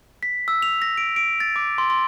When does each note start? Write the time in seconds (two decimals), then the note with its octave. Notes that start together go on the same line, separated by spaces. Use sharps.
0.23 B6
0.48 E6
0.62 F7
0.82 A#6
0.97 D7
1.16 D7
1.40 A6
1.56 D6
1.78 C6
1.90 C6